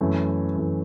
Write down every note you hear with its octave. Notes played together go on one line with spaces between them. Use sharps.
F#2 E3 A3
F#2 E3 A3